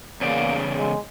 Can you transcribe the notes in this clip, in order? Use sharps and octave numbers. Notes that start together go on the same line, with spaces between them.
E2 C#3 A#3 D5
G#3